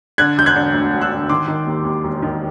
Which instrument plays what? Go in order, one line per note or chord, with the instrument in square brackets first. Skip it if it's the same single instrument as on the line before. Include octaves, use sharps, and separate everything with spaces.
[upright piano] D3 F#6 G#6
E1 G6
F#6 G#6
D3
D2
E1
E6 F#6
D3
D#3 C6 D6
D#3
D#2
D#2
E1
D#3